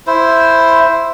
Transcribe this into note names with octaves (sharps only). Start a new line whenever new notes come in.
E4 C5